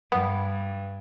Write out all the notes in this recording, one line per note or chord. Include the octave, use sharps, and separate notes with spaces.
G2 B3